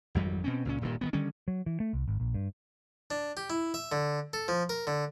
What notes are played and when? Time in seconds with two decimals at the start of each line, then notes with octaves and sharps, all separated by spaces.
0.15 G#1 F2 F#3 G3
0.44 B2 C4 C#4
0.65 C#2 A#2 C#4
0.81 D#1 G2 A#2
1.01 D#3 E3 B3
1.13 D3 D#3 G3 C#4
1.48 F#3
1.66 E3
1.80 A3
1.93 C2
2.08 G#1
2.20 A#1
2.34 G2
3.11 D4
3.37 G4
3.50 E4
3.74 E5
3.92 D3
4.33 A4
4.48 F3
4.69 A#4
4.87 D3